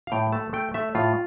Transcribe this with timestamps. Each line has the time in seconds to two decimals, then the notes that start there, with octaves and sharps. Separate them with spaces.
0.07 F5
0.12 A2 G5
0.32 A3 A5
0.53 A3 G5
0.74 A3 E5
0.95 A2 F4